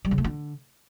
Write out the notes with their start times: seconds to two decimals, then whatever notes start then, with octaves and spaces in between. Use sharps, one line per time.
0.05 G3
0.11 C#3
0.18 A3
0.24 D3